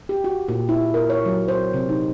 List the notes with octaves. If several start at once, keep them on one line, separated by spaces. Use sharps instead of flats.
G4
F#4
A#2
E4
A#4
C#5
F#3
C5
C3
D#4